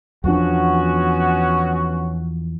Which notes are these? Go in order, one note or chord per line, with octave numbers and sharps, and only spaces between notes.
E2 F3 B3 C#4 D4 F#4